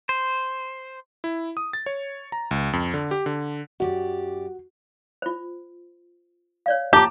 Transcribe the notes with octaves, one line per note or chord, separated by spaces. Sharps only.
C5
E4
D#6
A6
C#5
A#5
C#2
F2
D3
G4
D3
F#2 F#4 G4 D5
F4 C5
C#5 D5 F5
G4 A5 A#5 D6